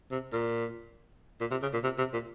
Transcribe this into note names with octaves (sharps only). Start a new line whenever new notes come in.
C3
A#2
A#2
C3
C#3
A#2
C3
C3
A#2